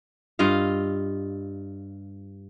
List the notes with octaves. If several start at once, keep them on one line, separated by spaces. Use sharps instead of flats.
G2 F4 D#5 F5